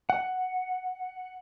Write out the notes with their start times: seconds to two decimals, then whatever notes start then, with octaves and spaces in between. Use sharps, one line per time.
0.10 F#5